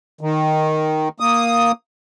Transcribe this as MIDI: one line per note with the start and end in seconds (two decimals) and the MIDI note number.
0.21 1.09 51
1.20 1.72 58
1.20 1.72 87